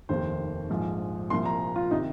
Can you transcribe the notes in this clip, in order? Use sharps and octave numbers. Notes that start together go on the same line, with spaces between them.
F1 D#2 D#3 C5
A#1 G#2 F3
C2 A#2 F3 C6
A#5
F4
C3 D#3 D#4